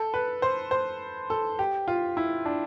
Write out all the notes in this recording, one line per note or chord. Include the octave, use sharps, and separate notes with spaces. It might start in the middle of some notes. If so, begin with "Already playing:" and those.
Already playing: A4
B4
C5
C5
A4
G4
F4
E4
D4